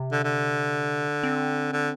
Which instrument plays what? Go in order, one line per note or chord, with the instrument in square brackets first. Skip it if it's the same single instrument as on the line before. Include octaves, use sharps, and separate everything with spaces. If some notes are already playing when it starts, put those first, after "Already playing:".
Already playing: [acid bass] C3
[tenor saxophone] D3
D3
[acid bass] C4
[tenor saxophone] D3